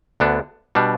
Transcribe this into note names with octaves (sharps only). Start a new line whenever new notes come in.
D2 D3 B3 D4
B2 G3 D4